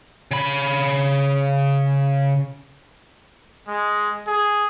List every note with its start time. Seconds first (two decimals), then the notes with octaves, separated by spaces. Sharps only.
0.31 C#3 B5
3.68 G#3
4.27 G#4